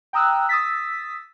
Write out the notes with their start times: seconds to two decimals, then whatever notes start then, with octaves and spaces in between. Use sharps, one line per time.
0.13 G5 A#5 D#6 E6 F#6
0.49 D#6 E6 A6 B6